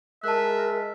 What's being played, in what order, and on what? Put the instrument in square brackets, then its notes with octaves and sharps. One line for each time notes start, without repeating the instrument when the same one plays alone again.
[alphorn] G#3 [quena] A#4 [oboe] E5 [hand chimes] A5 F#6